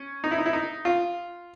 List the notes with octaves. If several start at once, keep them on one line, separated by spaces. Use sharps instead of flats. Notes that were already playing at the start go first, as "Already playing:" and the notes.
Already playing: C#4
D#4
E4
D#4
E4
D#4
F4